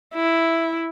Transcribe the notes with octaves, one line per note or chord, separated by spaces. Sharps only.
E4